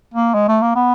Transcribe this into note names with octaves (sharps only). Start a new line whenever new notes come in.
A#3
G#3
A3
A#3
B3